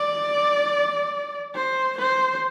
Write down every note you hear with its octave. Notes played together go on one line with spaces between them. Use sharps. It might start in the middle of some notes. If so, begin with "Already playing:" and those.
Already playing: D5
C5
C5